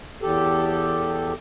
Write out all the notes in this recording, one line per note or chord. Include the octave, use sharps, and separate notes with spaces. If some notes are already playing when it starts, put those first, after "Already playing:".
E2 G4 A4